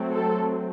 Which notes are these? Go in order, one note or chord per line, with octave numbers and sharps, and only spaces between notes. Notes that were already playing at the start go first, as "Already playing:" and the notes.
Already playing: F#3 A3 C4
A4